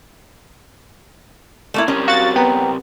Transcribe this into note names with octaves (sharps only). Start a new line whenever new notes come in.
A3 A#3 E4
C4 C#4 G4 A#4
F#4 F5 C#6 A6
B3 G5 A#5